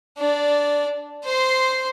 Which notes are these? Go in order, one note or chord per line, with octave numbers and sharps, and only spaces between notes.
D4 D5
C5 C6